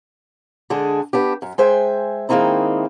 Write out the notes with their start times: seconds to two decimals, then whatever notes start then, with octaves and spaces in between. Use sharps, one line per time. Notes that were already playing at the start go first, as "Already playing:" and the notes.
0.70 D3 G#3 D4 G#4
1.13 B3 D4 G4
1.42 F#2
1.58 G#3 C5 E5 G5 G#5
2.29 D#3 G#3 A#3 C4 D#4 E4